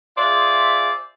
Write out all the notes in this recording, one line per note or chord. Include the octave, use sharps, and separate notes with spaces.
F4 G#4 C5 D5 E5